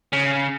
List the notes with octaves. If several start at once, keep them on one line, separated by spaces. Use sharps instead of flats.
C#3